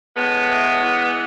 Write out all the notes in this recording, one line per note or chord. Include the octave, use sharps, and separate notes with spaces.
A2 G#3 B3
E3
E3